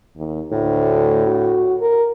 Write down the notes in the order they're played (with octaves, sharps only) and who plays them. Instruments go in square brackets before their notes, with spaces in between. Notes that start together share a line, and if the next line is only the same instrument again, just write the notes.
[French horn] D#2
[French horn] D2 [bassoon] A2
[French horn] F#4
A#4